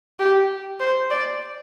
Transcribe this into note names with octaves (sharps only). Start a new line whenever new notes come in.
G4
C5
D5